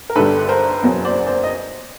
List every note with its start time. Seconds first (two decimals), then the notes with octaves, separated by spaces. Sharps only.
0.10 A#4
0.15 G1 G2 D3 G3 A4 B4
0.49 A#4 C5
0.82 F#1 E2 B2 F#3
1.04 C5 D5
1.27 C5 D5
1.43 D#5